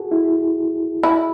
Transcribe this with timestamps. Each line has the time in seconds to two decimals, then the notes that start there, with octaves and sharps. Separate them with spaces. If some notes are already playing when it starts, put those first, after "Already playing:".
Already playing: F#4 G#4 A4
0.12 E4
1.03 E4